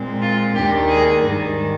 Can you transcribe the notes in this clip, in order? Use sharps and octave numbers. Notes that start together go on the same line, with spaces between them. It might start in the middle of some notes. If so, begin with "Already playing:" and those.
Already playing: A#2 G#3 C4
F4
D#2 D#3 A#3 D4 G4
G#4
G#2 D#3 G3